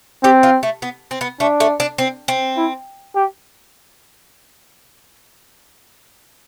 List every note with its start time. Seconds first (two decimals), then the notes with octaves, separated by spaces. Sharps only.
0.23 C4 G4
0.43 F4
0.63 A3
0.82 B3
1.11 C4
1.21 B3
1.40 A3 D4
1.60 A3
1.80 D4
1.98 C4
2.28 C4
2.57 E4
3.15 G4